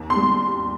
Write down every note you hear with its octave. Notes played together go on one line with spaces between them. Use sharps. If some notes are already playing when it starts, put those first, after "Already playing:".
Already playing: D#2
C6
G3